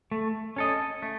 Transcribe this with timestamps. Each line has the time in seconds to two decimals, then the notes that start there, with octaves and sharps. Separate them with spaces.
0.11 A3
0.56 C#4 A4 D#5
1.02 A3